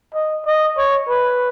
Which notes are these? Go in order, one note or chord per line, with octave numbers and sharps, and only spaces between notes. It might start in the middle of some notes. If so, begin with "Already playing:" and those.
D#5
D#5
C#5
B4